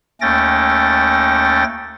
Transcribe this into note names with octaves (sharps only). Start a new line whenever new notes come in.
D#2 A3 C#4 G5 A6 A#6